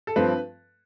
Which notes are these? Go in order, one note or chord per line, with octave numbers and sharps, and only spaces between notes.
A4
G2 F3 C4 B4